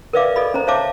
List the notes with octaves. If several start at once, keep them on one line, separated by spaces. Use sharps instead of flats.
A#4 B4 D5 E5 F5 D6
A4 D5 D#5 B5
C#4 C5 A#5
C5 C#5 E5 F5 A5 D6